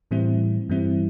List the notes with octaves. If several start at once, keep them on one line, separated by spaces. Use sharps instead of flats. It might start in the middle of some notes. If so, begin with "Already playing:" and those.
A2 E3 G3 C4 E4
G2 E3 G3 C4 E4